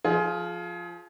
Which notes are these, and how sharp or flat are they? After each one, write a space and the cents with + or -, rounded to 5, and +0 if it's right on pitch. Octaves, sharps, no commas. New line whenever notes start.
F3 +0 F4 +0 G#4 +25